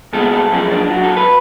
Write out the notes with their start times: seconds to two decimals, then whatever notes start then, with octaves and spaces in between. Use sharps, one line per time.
0.13 C#2 B2 G#3 A4
0.32 A4
0.51 F#2 F3 G#3 C#4
0.71 D4
0.90 G#2 F#3 F#4
1.04 A4
1.17 B4